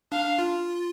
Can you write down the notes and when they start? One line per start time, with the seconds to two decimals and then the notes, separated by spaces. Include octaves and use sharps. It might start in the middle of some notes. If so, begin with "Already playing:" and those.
0.12 D4 F5
0.38 F4